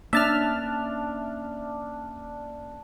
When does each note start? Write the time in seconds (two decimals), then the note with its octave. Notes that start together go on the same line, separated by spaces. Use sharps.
0.13 A#3 C#4 D4 E5 A5 F6